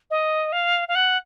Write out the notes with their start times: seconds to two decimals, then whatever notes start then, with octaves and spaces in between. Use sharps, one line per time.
0.10 D#5
0.52 F5
0.88 F5
0.95 F#5